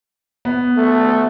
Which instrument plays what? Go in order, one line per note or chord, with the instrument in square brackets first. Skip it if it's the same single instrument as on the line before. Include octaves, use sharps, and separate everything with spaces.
[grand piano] B3
[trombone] A3